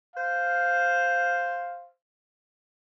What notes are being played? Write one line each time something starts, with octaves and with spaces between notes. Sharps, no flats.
C5 F5